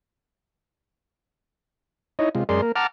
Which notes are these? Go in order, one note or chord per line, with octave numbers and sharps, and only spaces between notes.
D#4 E4 C#5 D#5
C3 G#3 F4
F#2 G#3 G#4 A#4 D5 C6
A#3 A#4
F#5 A5 A#5 D6 F6